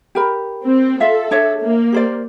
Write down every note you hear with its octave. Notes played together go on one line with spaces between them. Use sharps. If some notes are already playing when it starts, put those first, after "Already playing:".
G4 A#4 B5
C4
F4 A4 E5 F5
D4 C#5 E5
A#3
G4 C5 D5